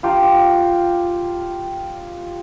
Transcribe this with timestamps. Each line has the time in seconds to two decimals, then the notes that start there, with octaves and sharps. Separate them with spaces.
0.03 F4 G4 A#5